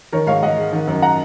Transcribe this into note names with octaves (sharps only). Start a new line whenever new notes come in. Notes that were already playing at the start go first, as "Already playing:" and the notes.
D#3 A#4 C#5
G#2 C#5 F5
G#2 D#5 F#5
G#3
D#3
F#2
F#5 A#5